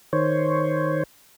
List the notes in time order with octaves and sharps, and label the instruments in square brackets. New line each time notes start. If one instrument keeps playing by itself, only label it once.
[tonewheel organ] D#3 C5 C#5